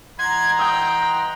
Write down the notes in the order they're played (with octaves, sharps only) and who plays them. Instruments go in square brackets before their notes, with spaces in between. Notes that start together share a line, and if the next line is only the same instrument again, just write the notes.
[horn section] E3 D#5 A#5 [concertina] F#5 C6 [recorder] G#6
[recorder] G5 [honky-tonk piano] D#6 G6